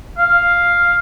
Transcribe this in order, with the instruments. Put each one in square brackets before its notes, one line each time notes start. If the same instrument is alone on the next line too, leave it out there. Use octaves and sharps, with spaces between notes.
[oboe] F5